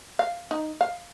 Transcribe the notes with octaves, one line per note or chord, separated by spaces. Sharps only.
F5
D#4
F5